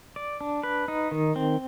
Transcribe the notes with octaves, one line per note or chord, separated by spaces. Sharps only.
D5
D4
B4
D#4
D#3
C4